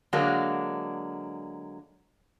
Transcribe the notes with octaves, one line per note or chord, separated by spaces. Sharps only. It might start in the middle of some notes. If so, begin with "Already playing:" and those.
D3 F#3 G#3 A#3 D4